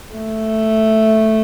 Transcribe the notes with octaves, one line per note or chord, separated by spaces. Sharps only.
A3